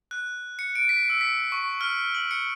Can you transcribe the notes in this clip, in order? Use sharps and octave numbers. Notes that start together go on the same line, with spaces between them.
F#6
C#7
D7
B6
E6
B6
C#6
F6
F#7
C#7